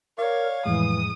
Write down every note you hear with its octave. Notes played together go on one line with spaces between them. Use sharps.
A#4 C#5 D5 F5
F2 A2 E3 G#3 D#6